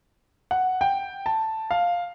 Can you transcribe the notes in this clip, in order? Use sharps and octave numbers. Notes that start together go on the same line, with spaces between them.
F#5
G5
A5
F5